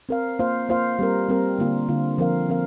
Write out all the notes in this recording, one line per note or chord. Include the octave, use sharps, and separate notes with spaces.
C4 A#4 F5
A#3 F4 C5 F5
A#3 F4 C5 F5
G3 C4 A#4
G3 C4 A#4
D3 A#3 F4
D3 A#3 F4
F3 C4 A#4 F5
F3 C4 A#4 F5